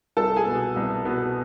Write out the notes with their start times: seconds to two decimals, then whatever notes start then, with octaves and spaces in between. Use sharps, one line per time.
0.17 C2 A4 A5
0.36 G#4 G#5
0.46 B2 B3
0.76 C2
1.05 B2 B3